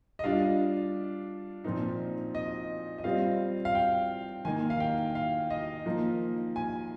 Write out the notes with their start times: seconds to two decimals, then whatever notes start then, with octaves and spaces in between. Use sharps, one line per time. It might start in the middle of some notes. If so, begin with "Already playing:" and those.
0.19 D#5
0.24 G3 D4 F4 F5
1.64 A#2 F3 C4 D#4
2.35 D#5
2.98 D#5
3.04 G3 C4 F4 F5
3.65 F5
3.75 G5
4.45 D#3 A#3 D#4 G#5
4.70 F5
4.80 G5
5.15 F5
5.50 D#5
5.86 F3 A#3 D#4
6.56 G#5